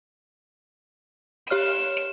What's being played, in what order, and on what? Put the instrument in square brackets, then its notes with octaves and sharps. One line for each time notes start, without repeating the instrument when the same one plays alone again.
[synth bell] G4 C#5 F6 [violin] E7